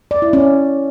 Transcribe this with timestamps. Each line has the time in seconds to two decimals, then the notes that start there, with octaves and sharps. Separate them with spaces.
0.11 D5
0.22 E4
0.33 C#4